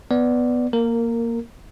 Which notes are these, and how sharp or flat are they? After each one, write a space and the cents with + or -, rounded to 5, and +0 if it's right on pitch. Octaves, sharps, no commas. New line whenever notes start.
B3 +5 D5 +0
A#3 +0 A#4 -15